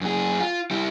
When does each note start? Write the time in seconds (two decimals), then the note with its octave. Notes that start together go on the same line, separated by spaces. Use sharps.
0.01 F#2 G#4
0.40 F4
0.71 G3 E4